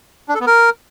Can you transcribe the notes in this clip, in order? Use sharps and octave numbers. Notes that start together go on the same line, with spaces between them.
D4
A4
B3
A#4